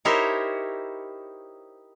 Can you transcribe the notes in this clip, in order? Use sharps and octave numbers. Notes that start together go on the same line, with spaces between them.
D#4 E4 G4 A#4 C5 C#5